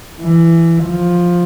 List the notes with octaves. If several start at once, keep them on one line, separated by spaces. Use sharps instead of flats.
E3
F3